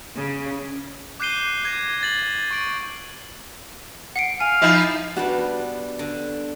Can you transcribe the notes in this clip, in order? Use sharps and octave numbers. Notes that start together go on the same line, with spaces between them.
C#3
D6 F#6 G6 C7 D#7 G7
D6 G#6 A#6 D#7
G#6 A6 F#7
C#6 D7 F#7
F#5 C7 D7
F5 G#5
F3 D#4 E4
G3 B3 D4 F#4
D3